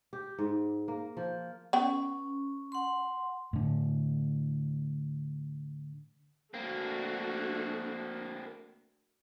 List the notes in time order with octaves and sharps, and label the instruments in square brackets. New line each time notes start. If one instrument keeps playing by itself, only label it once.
[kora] G4
G#2
A#3
F3
[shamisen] B3 G5 [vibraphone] C#4
[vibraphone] F#5 C6
[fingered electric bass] A2 D3
[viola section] A3 D4 F#4 [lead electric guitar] A#3 C4